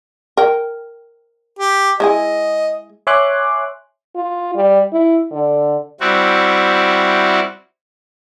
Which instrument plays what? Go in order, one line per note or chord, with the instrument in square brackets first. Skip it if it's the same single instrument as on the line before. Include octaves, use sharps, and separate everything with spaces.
[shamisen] A#4 G5
[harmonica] G4
[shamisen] G#3 E4 G#4 [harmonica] D#5
[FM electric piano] C#5 E5 G#5 C6 D6 F#6
[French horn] F4
G3
E4
D3
[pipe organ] G3 C4 E4 F#4